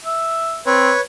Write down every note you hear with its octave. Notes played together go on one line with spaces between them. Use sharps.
E5
C4 B4 C#5